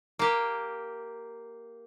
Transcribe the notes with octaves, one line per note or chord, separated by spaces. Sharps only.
A#3 G4